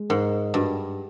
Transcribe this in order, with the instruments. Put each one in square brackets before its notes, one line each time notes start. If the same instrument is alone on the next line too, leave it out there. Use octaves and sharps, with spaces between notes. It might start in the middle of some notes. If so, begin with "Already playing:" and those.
Already playing: [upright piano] G#3
[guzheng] G#2 [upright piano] A#4
[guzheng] G2 [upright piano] F#4